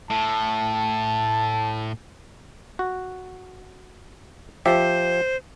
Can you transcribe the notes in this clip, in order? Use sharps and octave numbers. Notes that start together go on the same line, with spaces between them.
A2 A5
F#4
F3 G4 C5 E5